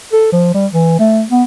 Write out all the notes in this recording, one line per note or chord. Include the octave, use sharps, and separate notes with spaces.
A4
F3
G3
E3
A3
B3